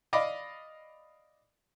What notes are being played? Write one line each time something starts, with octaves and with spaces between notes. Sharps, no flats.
D5 D#5 F5 B5 D6